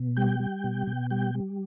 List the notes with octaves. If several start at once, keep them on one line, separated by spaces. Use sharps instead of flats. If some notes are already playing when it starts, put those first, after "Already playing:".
Already playing: B2
G3 G5
G3
B2
B2
G3 G5
G3